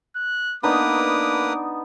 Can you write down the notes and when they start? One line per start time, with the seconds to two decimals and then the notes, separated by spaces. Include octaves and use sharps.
0.16 F#6
0.63 A#3 B3 D4 D#4 B4 D6 D#6